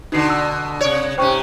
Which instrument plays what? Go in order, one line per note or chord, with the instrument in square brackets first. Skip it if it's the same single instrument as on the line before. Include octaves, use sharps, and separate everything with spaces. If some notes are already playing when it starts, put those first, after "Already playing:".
[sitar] B2 D3 [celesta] D#4 C7
[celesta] E6
[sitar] C3 C#5 [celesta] D5 D7
[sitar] G#2 C3 C#4 [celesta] C5 G5 C#6